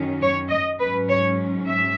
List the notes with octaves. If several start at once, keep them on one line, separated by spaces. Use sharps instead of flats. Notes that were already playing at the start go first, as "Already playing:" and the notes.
Already playing: F#2 D#3 F#3 C#4
C#5
D#5
G#2 F#3 C#4 B4
C#5
E5